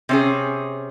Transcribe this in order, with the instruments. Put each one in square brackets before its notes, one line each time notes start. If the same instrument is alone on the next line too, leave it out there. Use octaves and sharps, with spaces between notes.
[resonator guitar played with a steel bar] C3 C#4 G#4